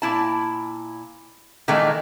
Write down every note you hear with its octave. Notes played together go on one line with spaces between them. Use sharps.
A#2 E4 A5
A#2 D#3 E3 G#3 A3 D#4